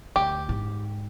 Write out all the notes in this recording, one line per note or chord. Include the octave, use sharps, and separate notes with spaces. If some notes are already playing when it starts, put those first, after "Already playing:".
D2 G4
G#2